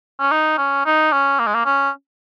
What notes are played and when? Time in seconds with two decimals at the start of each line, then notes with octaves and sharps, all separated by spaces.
0.20 C#4
0.31 D#4
0.58 C#4
0.85 D#4
1.12 C#4
1.39 A#3
1.47 G#3
1.54 A#3
1.65 C#4